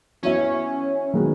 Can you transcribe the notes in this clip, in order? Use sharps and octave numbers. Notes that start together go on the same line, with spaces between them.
E3 B3 C#4 F#4 C#5 E5
D#3 G#3 B3 F#4